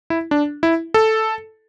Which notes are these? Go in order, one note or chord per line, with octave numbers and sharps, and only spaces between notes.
E4
D4
E4
A4